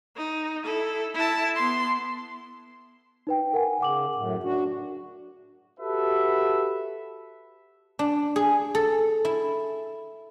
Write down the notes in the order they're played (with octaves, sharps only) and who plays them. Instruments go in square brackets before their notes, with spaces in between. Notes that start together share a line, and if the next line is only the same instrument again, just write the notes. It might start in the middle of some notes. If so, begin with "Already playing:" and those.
[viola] D#4
E4 A4
E4 A5
B3 C6
[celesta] D#4 B4 G5
A#4 F#5 G#5
[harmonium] C#3 [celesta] F#5 D6 F#7
[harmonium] F#2 A2
D4 F#4
[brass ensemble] F#4 G4 A4 B4 E5
[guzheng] D4
G#4
A4
E4